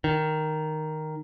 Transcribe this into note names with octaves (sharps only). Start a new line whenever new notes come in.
D#3